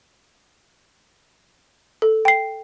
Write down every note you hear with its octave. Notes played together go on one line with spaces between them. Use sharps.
A4
G5 C7